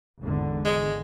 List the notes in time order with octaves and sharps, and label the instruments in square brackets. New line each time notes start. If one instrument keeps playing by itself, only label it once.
[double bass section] G#1 E2 D3
[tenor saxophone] G#3